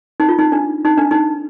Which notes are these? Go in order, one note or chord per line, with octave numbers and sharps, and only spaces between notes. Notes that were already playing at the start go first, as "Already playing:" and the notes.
D#4
F4
D#4
D4
D#4
D4
D#4